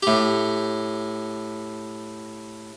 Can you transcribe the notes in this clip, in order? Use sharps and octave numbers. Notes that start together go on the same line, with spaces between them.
A2 G4